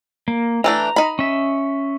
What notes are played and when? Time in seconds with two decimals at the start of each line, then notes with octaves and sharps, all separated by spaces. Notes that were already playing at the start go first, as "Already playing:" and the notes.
0.28 A#3
0.64 E3 A3 D4 A#5
0.96 D#4 B5
1.19 C#4 E5